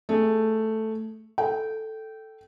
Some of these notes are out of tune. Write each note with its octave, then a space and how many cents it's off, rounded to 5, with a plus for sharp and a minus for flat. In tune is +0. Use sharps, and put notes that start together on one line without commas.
A3 +0 G#4 +0
A4 +0 G5 -15